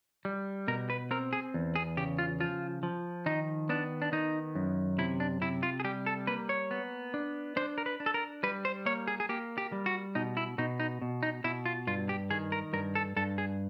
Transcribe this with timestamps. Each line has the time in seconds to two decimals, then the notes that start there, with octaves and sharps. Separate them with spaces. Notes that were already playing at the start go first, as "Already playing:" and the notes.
0.25 G3
0.68 B2 A#4
0.90 B4
1.11 C4 A#4
1.33 G#4
1.54 E2
1.76 G#4
1.97 C#3 G4
2.19 F4
2.40 F3 F4
2.83 F3
3.26 D#3 D#4
3.69 B3 D4
4.02 D4
4.12 D#3 D#4
4.55 F#2
4.98 C3 E4
5.20 D4
5.41 C3 E4
5.63 F4
5.80 G#4
5.84 G3 G4
6.06 A4
6.27 A#3 B4
6.49 C#5
6.71 B3
7.14 D4
7.57 D4 C5
7.78 A#4
7.86 B4
8.00 D4
8.06 A4
8.14 A#4
8.43 G3 B4
8.65 C5
8.86 A#3 C#5
9.08 G#4
9.20 G#4
9.29 A#3 G4
9.58 G4
9.72 G3
9.86 F#4
10.15 B2 D#4
10.37 E4
10.58 B2 D#4
10.80 D#4
11.02 B2
11.23 D#4
11.44 B2 E4
11.66 F4
11.87 G2 F4
12.09 G4
12.30 D#3 G#4
12.52 A#4
12.73 G2 A#4
12.95 A4
13.16 G2 A4
13.38 G#4